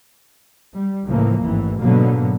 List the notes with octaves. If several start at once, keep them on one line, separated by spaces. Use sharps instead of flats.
G3
C#2 A2 E3 F3 A#3
A1 F2 G#2 E3
G#2 B2 D3 F#3 A#3 B3